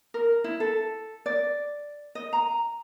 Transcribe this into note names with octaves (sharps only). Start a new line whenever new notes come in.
A#4
E4
A4
D5
D#5
A#5